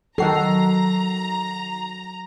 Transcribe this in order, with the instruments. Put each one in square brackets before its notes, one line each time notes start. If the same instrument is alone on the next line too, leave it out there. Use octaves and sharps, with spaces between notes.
[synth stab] D#3 F#4 C7 [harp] F#3 [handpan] A4 [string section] A#5